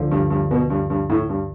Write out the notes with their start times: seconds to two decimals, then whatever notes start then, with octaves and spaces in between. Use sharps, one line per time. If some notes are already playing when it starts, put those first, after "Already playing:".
Already playing: D2 D3 F3
0.11 G2
0.30 G2
0.51 B2
0.70 G2
0.90 G2
1.10 A2
1.29 G2